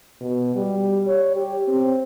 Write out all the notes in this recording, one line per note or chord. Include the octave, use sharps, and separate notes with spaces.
B2
G3
C#5
G4
C4